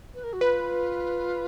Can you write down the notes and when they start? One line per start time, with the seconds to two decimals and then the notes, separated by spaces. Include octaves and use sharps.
0.14 B4
0.23 A#4
0.32 F#4
0.41 F4 B4